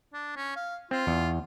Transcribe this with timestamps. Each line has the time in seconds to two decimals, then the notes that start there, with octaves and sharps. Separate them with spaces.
0.14 D4
0.36 C#4
0.56 F5
0.91 C4 F4
1.07 E2